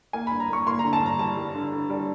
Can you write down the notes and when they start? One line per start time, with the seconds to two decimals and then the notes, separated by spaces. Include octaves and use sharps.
0.13 A#3 G#5
0.27 G2 B5
0.40 A#5
0.49 A#3 C#6
0.67 A#3 C6
0.79 D3 A#5
0.93 A5
1.01 G2 A#5
1.19 G3 A5
1.37 G3
1.55 D3
1.72 D3
1.90 G3